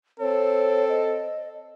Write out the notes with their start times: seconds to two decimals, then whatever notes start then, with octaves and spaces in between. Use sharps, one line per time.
0.20 C4 A4 C#5
0.89 D#5